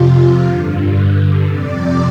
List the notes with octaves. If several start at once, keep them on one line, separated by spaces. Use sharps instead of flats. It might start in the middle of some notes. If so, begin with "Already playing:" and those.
Already playing: F2 C3 F4
G2 D3
F2 C3 D5